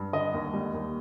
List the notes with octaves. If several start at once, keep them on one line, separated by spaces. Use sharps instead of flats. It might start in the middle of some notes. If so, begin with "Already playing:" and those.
Already playing: G2
D3 D#5
D#2
G3
D#2